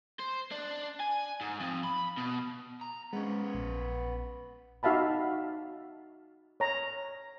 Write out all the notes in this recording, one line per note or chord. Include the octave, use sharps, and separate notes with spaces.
C5
D4
G#5
G#2
F2
B5
B2
A#5
G#3 B3 C#4
A#1
D#4 F#4 E5 F5 A5 B5
C#5 A#5